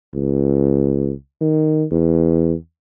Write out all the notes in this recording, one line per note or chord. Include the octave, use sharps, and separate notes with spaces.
C#2
D#3
E2